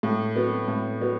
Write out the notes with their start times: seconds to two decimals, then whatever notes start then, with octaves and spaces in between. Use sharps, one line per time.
0.03 A2
0.36 F#3 B3
0.68 A2
1.01 F#3 B3